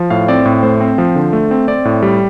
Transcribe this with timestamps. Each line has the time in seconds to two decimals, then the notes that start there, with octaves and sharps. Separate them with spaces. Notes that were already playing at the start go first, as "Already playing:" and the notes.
Already playing: F3
0.10 A2 F5
0.28 C4 D5
0.45 A2
0.63 A3 C5
0.81 C4
0.98 F3
1.15 D3
1.33 A3
1.51 C4
1.68 C4 D5
1.85 A2
2.03 G3